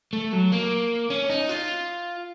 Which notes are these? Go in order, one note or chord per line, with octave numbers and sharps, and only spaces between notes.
A3
F#3
A#3
C#4
D#4
F4